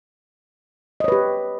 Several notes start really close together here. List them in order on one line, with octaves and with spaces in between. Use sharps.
D#5 C#5 B4 G4